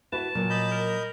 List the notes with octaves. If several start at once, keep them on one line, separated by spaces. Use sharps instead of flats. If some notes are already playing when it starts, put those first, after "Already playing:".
E4 F#4 B4 A5
A#2 F#3
D#5 B5 G6
A#4